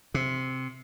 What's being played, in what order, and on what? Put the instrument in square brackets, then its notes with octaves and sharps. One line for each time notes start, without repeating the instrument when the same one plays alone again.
[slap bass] C3